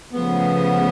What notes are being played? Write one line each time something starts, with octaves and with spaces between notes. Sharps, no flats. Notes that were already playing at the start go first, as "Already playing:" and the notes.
C#3 F3 A3 B3